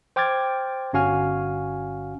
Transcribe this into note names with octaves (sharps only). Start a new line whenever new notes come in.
C5 G5 D6 F6 G#6 A6
G1 C#4 F#4 F5 G#5 F6